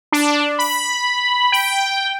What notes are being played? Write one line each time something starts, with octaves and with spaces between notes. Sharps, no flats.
D4
B5
G5